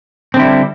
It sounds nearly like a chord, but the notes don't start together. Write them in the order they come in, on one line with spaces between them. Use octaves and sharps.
C4 D3 E4 G3